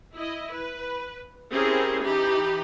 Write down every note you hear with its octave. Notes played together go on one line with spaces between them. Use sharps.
E4 D#5
B4
C4 C#4 E4 G4 G#4 A#4
E3 D#4 G4 B5